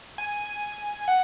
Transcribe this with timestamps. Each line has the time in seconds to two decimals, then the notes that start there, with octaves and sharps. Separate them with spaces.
0.18 G#5
1.08 F#5